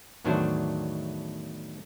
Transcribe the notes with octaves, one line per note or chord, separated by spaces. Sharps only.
E2 A2 D#3 F#3 D4 C5